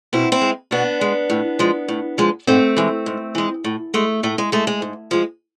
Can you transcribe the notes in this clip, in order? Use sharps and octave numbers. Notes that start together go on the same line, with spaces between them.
B2 C4 E4
C4 E4
G#3
B2 B3 D4
G#3
A2
F3 G#3
A2
F3 G#3
G#2 A3 C4
E3 G#3
G#2
E3 G#3
A2
G#3 A3
A2 A3
G#3
G#3 A3
G#3
G#2
F3 G#3